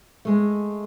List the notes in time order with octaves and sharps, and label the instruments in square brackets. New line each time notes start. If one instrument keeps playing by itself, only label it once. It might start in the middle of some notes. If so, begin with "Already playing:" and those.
[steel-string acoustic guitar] G#3 A3